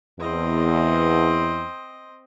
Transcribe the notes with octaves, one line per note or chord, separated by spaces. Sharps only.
E2 C4 D#5